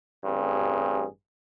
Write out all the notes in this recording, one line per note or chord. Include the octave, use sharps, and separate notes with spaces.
A1 G2 C4 G#4